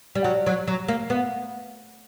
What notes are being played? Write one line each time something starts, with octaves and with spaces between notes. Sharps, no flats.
G3
F#3
F#3
F#3
A#3
B3